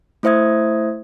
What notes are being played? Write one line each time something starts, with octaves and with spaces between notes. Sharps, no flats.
A3 E4 C5 E5 D#6 G#6